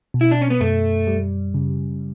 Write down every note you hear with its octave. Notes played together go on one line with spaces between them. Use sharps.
B2
E4
D4
C#4
B3
F#2 A3
G3
C#3